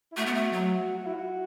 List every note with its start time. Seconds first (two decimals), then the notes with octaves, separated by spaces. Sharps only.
0.12 E4
0.16 A3 F#4
0.26 B3
0.35 A3
0.53 F#3
0.98 F#4
1.06 E4
1.14 F#4